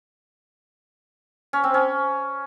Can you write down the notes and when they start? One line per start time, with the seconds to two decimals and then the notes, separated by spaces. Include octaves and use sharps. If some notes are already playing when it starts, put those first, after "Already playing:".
1.53 C#4
1.64 C4
1.74 C#4